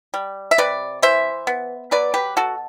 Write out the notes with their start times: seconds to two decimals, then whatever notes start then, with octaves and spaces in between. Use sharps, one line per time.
0.14 G3
0.51 E5
0.58 C3 B4 D5
1.02 E3 C5 E5
1.47 B3
1.91 F#3 B4 D5
2.14 G4 B4
2.36 B2 F#4 A4